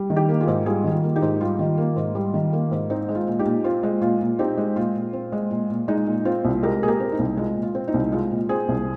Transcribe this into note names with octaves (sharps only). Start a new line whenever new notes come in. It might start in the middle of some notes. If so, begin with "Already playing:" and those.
Already playing: G3
D#3
D#4 G4
A#3
F4 G#4
G#2
G3 F4 G#4
D#3
F4
A#3
D#4 G4
G#2
G3 F4
D#3
A#3
G#2
G3
D#3
A#3
G#2
C4 D#4
G#3
F4
A#2
D#4 G4
A#2
C4 F4
G#3
A#2 F4
A#2
C4 D#4 G4
G#3
A#2 F4
A#2
C4
G#3
A#2
A#2
G#3 D#4
A#2
C4 F4
C2
G#3 G4 A#4
A#2 G#4
G4 A#4
C4
D#4
C2
G#3 F4
A#2
F4
C4
D#4
C2
G#3 F4
A#2
C4 G#4 C5
C2